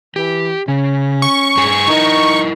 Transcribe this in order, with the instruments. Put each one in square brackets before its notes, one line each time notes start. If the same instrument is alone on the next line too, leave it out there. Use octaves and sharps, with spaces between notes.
[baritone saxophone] E3 [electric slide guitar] G4
[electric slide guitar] C#3 [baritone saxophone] C#4
[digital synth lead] C#6
[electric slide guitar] G2 G#4 G#5
[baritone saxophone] D#4 [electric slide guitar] E4 A#4 D#5